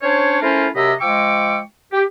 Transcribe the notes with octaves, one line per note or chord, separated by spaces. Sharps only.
C#4 D4 C5 C#5
A3 C#4 E4 F4 A#4 C5
F#2 C3 G4 D#5 B5 E6
F3 G#3 G5 C#6 D6 E6
G4